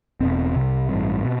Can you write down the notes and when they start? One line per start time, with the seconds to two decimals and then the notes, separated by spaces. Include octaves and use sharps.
0.20 E1 E2 B2 C4
0.56 C2 C3
0.90 A1 G2
1.25 B2